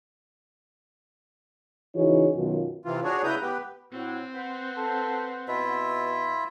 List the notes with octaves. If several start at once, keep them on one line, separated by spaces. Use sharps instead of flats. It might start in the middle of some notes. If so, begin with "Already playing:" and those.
C#3 E3 D#4 F#4 G#4 C#5
F#2 B2 D#3 F#3 F4 F#4
C3 E3 F4
D4 F#4 G#4 C#5
C#3 E4 B4 A#5 D#6 G6
B3 G4 B4
A2 C4 E4 F#4
B4 C5 F#5
A4
B2 E4 F4 E5